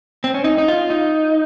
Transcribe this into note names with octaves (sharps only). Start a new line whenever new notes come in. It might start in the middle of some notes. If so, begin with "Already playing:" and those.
C4
C#4
D#4
D#4
F4
D#4